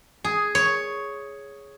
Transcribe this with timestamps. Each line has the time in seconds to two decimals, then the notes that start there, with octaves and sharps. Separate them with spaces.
0.24 G#4
0.55 C#5